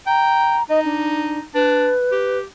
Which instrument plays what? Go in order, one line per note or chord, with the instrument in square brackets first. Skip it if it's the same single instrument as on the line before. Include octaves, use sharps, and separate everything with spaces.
[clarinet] G5 [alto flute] A#5
[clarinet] D#4 [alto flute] D#5
[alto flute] D4
[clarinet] D4 [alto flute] B4
[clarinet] G4